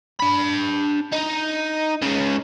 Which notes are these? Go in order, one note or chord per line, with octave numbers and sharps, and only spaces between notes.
D4 B5
D#4
C#3 G#3